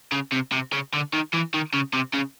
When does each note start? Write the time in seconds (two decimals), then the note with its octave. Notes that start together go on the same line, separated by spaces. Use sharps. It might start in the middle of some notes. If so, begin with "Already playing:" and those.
0.12 C#3
0.33 C3
0.52 C3
0.73 C#3
0.93 D3
1.13 D#3
1.33 E3
1.54 D#3
1.74 C#3
1.93 C3
2.14 C#3